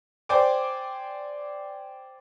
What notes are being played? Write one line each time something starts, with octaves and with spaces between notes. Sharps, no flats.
C5 D5 G5 G#5 D6